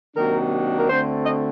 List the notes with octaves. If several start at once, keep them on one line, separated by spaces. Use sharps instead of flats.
C3 D#3 F#3 A#3 D4 A#4
A#4
D2 D3 A3 C4 C5
D#5